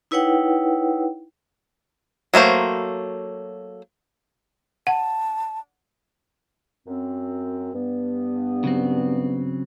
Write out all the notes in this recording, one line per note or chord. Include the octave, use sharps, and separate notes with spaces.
D#4 E4 B4 C#5 F#5 G5
F#3 A3 A#3 C5
F#5 A5
F#2 C4
G2 B3
C#3 F#3 C4